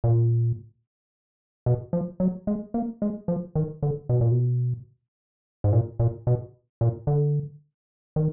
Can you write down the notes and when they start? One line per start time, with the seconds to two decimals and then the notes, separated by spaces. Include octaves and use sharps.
0.04 A#2
1.66 B2
1.93 F3
2.20 F#3
2.47 G#3
2.74 A#3
3.02 G#3
3.28 F3
3.55 D#3
3.83 D3
4.09 B2
4.21 A#2
4.32 B2
5.64 G#2
5.73 A#2
5.99 A#2
6.27 B2
6.81 A#2
7.07 D3
8.16 D#3